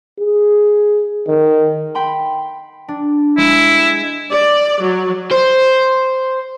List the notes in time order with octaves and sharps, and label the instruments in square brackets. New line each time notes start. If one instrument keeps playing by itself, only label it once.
[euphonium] G#4
D#3
[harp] G5 B5 C6
D4
[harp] G#3 [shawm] E4
[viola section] D5
F#3
[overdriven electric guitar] C5